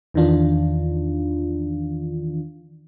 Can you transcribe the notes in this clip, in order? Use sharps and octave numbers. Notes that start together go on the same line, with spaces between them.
E2 D#3 E3 D4 F4